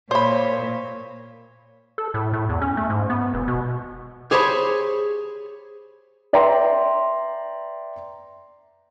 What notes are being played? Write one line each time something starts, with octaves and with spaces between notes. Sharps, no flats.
A#2 C5 C#5 B5
A4
A2
A2
E2
C#4
A3
G#2
B3
E1
B2
G4 G#4 C5 C#5 A5 B5
B4 D5 E5 G5 A#5 C6